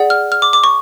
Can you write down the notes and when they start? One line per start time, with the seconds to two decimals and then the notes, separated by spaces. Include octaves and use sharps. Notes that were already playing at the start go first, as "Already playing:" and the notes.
Already playing: G#4 D5 F#5
0.10 F6
0.32 F6
0.42 D6
0.53 D6
0.64 C#6